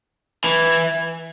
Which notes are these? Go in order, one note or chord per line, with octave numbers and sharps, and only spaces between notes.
E3